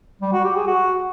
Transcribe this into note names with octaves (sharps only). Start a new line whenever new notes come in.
G3
F#4
G4
G#4
F#4